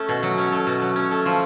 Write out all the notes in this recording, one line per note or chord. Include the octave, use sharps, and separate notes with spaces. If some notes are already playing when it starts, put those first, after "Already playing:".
Already playing: A3 C#4
B2
F#3
C#4
A3
B2
F#3
C#4
A3
F3